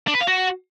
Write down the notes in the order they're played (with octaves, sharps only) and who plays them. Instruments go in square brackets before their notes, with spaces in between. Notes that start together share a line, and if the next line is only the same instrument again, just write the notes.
[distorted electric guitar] D4
B4
F5
F#4